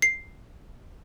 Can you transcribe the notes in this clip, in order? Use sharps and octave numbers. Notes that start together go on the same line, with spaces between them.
C7